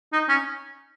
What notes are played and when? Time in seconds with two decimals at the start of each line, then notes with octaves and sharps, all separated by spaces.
0.13 D#4
0.29 C#4